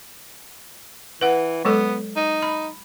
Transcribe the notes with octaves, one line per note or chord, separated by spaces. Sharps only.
E3 B4 F#5
F#3 G#3 B3 A4
D#4
B5